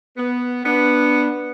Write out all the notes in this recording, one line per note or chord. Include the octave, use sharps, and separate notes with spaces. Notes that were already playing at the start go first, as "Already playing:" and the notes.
B3
B3 D4